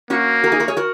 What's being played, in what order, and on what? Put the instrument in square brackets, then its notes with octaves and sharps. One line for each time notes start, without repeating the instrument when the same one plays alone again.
[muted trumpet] A#3 [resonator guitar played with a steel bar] C#4 F#4
[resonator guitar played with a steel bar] F#4 A#4
D#4 G#4
F#4 A#4
G#4 C#5
F#4 A#4